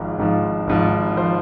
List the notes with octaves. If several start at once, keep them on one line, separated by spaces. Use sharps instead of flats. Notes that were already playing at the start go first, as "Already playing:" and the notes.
Already playing: G#1 G#2 F3
G#1 G#2 F3
G#1 G#2 F3
F3 C5